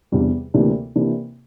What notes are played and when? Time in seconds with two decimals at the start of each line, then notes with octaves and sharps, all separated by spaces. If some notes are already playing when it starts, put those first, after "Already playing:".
0.12 E2 C3 G3 D4
0.54 D2 C3 E3 A#3 D4
0.96 C3 E3 A#3 D4